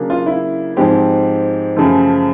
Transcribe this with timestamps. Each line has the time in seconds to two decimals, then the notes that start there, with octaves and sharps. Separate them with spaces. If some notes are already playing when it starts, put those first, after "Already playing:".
Already playing: C#3 F#3 A#3 D4
0.10 F4
0.26 E4
0.77 G#2 F3 G#3 C4 G4
1.76 F#2 C#3 F3 A3